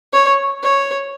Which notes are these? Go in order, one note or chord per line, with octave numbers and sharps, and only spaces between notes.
C#5
C#5